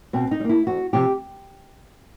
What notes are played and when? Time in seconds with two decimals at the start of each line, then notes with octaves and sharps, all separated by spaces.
0.13 B2 C4
0.31 D#4
0.40 G3
0.44 A#3 E4
0.67 F2 F#4
0.93 C3 F3 G4